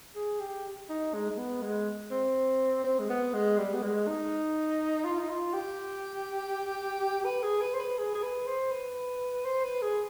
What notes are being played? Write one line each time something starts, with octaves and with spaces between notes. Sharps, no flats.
G#4
G4
D#4
G#3
G#3
B3
G#3
C4
C4
G#3
B3
G#3
G3
B3
G#3
D#4
F4
D#4
F4
G4
B4
G#4
B4
C5
B4
G#4
G#4
B4
C5
B4
C5
B4
G#4